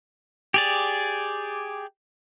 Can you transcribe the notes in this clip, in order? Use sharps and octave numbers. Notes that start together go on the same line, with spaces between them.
G4 G#4 D5